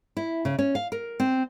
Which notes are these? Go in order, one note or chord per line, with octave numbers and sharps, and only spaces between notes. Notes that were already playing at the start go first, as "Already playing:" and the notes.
E4
C#3
C#4
F5
A#4
C4